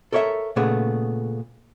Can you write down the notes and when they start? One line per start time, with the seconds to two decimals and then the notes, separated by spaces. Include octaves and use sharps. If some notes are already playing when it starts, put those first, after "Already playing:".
0.12 A4 A#4 C#5 D#5 E5
0.56 A#2 C#3 A3 B3 G#4